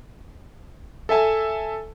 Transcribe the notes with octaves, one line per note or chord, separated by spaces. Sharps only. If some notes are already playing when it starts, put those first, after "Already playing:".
A4 E5 G#5 A5